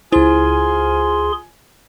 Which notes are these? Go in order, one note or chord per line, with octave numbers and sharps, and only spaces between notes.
C#2 E4 F4 G#4 C5 G#5 C6